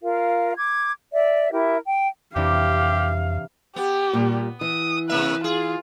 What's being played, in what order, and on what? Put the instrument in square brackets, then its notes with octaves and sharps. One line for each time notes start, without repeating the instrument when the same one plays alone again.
[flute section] F4 A#4 F5
D6 G#6
D5 E5
E4 G4 A#4 E5
G5
[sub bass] F2 [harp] C3 E3 D4 [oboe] G4 [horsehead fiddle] F5
[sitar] B3 [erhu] G4
[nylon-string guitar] A#2 G3
[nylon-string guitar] E3 [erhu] D#6
[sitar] C3 A#3 E5 [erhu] B4
[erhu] F4 [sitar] G#4